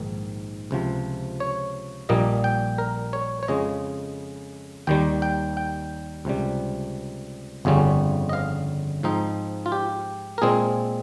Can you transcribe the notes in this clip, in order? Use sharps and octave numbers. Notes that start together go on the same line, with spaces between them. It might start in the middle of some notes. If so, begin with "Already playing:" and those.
Already playing: A#1 G#2 D#3
C#2 C3 F3
C#5
A#1 A#2 G3 A#3 D#5
G5
A#4
C#5
C#5
F2 C#3 G#3 D#5
D#2 D#3 G3 G5
G5
G5
C#2 C3 G3
G1 F2 C#3 G3 C#4
D#5
F5
G#2 F3 C4 D#4
F4
G4
A#4
A#2 G#3 C4 G#4